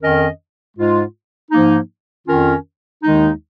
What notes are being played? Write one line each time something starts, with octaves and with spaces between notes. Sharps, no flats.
F2 D#3 C#4 A#4 D#5
G#2 G#3 F4
G#2 F3 A#3 D#4
F2 D#3 C#4 F4 A#4
D#2 D#3 G#3 D#4